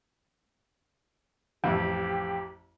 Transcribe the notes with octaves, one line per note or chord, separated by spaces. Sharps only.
A1 F2 G4